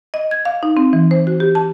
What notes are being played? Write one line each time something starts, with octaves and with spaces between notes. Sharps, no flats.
D#5
G#6
F5
D#4
C4
E3
C5
F#4
G4
A5